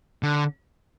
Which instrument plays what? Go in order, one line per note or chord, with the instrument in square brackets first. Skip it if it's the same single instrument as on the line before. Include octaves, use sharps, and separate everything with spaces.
[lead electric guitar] D3